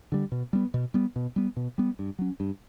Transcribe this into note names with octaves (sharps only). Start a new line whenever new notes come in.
D3 G3
B2
G3 B3
B2
G3 B3
B2
G3 B3
B2
G3 B3
G2
F#3 C#4
G2